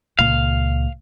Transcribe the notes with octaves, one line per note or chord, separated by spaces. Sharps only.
C#2 A#2 F5